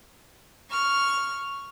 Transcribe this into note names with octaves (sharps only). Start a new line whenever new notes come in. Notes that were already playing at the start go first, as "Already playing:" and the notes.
C#6 F6